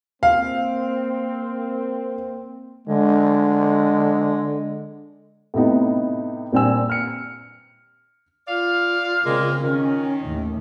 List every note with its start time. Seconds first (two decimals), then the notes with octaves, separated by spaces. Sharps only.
0.23 A#3 C4 F5
2.88 D3 G#3
5.54 A2 C3 B3 D#4
6.52 A#2 G3 C4 G#5 E6
6.90 F6 C#7
8.48 F4 D5 F5 F6
9.24 A#2 C#3 G#3 A#3 C4
9.63 D#3 C#4
10.25 D#2 A2